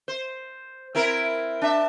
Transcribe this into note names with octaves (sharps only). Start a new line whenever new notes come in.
C5
C4 E4 A#4
D4 E5